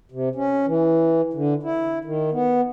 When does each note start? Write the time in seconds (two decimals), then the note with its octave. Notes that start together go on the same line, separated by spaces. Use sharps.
0.12 C3
0.35 C#4
0.66 E3
1.33 D3
1.63 E4
2.05 D#3
2.32 B3